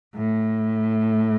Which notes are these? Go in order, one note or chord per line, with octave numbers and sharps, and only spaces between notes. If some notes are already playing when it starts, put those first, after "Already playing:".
A2